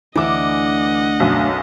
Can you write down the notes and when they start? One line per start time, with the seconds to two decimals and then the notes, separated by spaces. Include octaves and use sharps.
0.16 D2 E3 D#5 E5 F#5 D6
1.20 B1 F#2